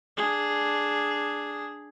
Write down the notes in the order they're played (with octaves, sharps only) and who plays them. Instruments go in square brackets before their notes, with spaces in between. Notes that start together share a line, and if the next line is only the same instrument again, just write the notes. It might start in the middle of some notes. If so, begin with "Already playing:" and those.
[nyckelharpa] D4 G#4